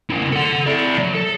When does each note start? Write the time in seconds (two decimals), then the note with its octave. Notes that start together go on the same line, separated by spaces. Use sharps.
0.10 C#3 E4
0.33 A4 F#5
0.66 E4 D5
0.98 F#3
1.14 A4